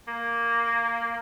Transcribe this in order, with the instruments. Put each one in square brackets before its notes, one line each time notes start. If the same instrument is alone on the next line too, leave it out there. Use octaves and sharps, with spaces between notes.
[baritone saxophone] A#3